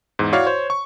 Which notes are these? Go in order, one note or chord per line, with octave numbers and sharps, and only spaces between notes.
E2 G#2
E4 F#4 C#5 D5 F5 C#6
C5 C#5
C#6